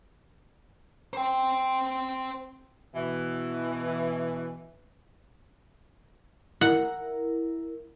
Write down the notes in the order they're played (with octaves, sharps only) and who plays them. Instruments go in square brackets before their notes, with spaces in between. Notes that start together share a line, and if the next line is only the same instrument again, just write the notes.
[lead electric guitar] C5 G5
[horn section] B2 E3
[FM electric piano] E4 A#4 [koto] F#5